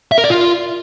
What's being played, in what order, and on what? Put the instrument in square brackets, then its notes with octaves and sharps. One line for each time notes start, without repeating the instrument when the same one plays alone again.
[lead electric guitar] E5
A#4
D5
F4